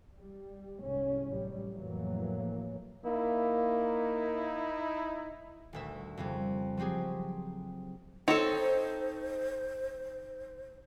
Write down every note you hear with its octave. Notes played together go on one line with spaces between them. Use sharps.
G3
C2 G#2 C#4
A1 F#3 G3
F2 A2 E3 F#3 A#3
A#3 D#4 E4
D#1 D2 E5
F2 C#3 G3
F3 F#3 C4 G4 G#4
C4 D#4 A4 C5 C#5